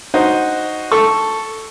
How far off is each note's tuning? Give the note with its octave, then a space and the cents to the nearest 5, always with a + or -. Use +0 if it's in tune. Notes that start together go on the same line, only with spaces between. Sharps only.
D#4 +0 F#4 +0 C5 +0
A4 +0 C#6 +0